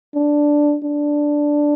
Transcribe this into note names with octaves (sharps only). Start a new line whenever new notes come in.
D4
D4